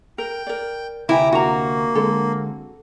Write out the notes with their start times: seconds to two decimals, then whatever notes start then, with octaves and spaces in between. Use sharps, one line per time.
0.18 A#4 G5
0.47 A#4 D5
1.09 D2 C3 E4 B4 G5 G#5 A#5 D6
1.32 A#3 D4 F#4 A#5
1.95 D3 G#3 C4 A4